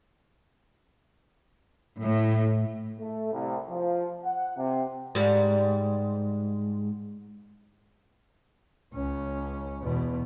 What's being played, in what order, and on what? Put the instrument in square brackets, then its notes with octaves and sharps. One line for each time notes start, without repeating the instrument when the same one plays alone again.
[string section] A2
[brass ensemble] A3
C2
F3
F#5
C3
[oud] G#2 G3
[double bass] C#2 C#4
E2 B2